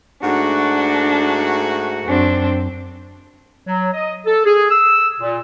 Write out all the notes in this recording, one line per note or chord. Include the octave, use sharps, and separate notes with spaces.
G#2 A3 D4 F#4
F#2 C4 D4
F#3
D#5
A4
G#4
E6
A#2